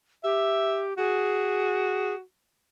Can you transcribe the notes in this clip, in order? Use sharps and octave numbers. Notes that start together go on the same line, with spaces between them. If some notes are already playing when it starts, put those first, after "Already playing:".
G4 E5
F#4 G#4